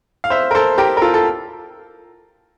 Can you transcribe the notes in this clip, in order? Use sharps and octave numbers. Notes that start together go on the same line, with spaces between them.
F5
C5 E5
A#4
A4 C5
G4 A#4
A#4
F4 A4
A4